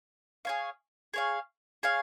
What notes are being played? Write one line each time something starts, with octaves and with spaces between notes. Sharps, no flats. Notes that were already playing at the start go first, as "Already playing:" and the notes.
G#4 C#5 F5
G#4 C#5 F5
G#4 C#5 F5